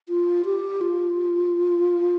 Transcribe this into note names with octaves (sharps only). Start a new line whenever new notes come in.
F4
G4
F4